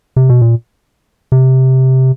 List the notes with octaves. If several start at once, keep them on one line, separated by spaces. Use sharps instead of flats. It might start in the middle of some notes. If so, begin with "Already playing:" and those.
C3
B2
A#2
C3